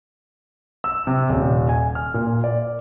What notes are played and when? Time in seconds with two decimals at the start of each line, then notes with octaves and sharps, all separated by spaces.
0.84 E6
1.07 C3
1.29 D#1
1.69 G#5
1.95 F6
2.14 A#2
2.44 D5